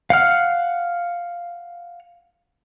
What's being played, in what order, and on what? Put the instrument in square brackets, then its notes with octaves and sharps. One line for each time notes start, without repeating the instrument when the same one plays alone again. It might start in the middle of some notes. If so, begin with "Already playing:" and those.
[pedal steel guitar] F5 F#5 F6